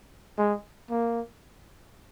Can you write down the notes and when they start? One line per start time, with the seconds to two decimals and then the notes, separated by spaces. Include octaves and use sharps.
0.38 G#3
0.90 A#3